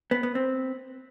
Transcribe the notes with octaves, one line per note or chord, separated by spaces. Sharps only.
B3
B3
C4